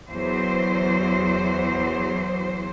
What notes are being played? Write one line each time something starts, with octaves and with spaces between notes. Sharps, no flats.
E2 F#3 C5